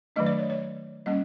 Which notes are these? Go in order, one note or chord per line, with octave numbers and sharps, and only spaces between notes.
D#3 F#3 A3 D4 D#5
D5
C#5
C#5
G3 A#3 C#4 D#5